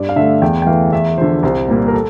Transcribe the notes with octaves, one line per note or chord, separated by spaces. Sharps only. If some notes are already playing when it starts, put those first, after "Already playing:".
Already playing: G2 D5
F5
D3 A3 E5
E2 G5
G5
E3 A3 F5
E2 E5
D3 F3 C5
C2 C5
A#2 G3 A#3
A#4
A4